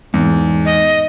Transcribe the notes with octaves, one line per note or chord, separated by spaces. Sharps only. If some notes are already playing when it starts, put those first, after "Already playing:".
E2 G#2
D#5